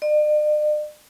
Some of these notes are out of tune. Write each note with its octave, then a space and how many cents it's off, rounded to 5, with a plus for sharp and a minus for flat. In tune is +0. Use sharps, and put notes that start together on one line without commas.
D5 +45